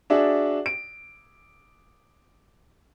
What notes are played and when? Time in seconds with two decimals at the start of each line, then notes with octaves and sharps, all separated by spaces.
0.10 D4 F#4 G#4 D5 E5
0.66 D7